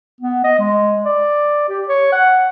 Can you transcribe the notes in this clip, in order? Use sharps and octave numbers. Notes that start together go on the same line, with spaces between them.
B3
D#5
G#3
D5
G4
C#5
F#5